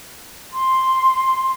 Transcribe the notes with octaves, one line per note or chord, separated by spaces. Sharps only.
C6